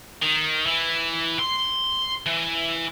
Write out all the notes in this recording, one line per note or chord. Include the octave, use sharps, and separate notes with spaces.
D#3
E3
C6
E3